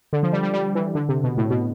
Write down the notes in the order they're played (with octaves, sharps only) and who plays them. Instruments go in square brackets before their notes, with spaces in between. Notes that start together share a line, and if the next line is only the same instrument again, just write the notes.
[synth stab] D3
F3
G3
G3
G3
E3
D3
C3
B2
A2
B2